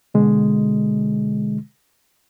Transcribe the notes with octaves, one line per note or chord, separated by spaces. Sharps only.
B2 D3 G#3